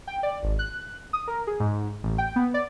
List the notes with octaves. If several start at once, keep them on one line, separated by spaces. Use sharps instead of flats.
G5
D5
G#1
F#6
D#6
A#4
G#4
G#2
A1
G5
B3
D5